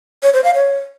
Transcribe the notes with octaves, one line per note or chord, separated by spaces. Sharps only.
C#5
C5
F5
C#5